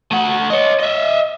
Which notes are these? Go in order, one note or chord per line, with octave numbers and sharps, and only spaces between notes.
A3 F#5
C#5 D#5
D#5 E5